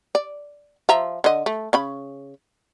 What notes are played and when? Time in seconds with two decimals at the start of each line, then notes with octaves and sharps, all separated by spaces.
0.15 D5
0.89 F3 E5 A#5
1.24 D3 D#5
1.46 A3
1.73 C#3 C#4 B5